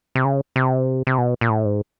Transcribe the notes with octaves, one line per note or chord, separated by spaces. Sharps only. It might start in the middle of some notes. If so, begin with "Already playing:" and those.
C3
C#3
C3
C3
B2
A#2
A2
G#2